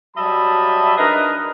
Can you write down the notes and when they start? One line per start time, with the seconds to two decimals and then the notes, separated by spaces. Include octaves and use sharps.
0.17 F#3 G3 D#5 E5 A5 B5
0.98 D4 D#4 G#4 A#4 B4 D#5